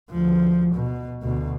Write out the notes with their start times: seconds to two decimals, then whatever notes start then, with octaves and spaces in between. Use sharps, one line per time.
0.10 D2 F3
0.75 B2
1.23 D2 B2